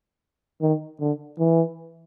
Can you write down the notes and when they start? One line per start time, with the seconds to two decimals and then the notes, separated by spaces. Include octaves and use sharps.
0.62 D#3
1.00 D3
1.39 E3